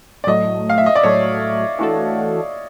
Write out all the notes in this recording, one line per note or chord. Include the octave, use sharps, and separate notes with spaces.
D5
A2 F#3 A3 D#5
F5
E5
D#5
D5
A2 F#3 A3 C#5
E3 A3 D4 F#4 A4